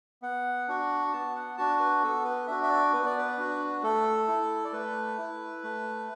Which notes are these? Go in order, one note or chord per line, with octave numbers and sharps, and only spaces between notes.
B3 F#5
D4 F#4
F#5
B3 A5
F#5
D4 F#4 A5
B4
B3 A4
B4
D4 F#4 E5
E5
D5
B3 B4
D5
B4
D4 F#4
A3 A4
E4
D5
A3 B4
E4
A3